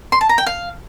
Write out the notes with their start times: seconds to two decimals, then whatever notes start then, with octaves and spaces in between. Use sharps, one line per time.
0.12 C6
0.21 A5
0.29 A#5
0.38 G5
0.46 F5